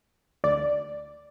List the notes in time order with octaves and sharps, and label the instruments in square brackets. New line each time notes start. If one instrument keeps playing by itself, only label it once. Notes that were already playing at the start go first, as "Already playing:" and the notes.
[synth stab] D2 D5